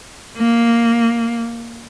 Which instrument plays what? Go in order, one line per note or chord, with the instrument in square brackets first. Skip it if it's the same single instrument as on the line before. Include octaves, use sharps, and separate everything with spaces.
[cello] A#3